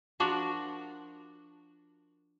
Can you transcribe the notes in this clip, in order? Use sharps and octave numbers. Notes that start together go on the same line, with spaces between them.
F3 D4 F#4 A#4